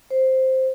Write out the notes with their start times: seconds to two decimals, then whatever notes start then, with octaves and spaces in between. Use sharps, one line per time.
0.11 C5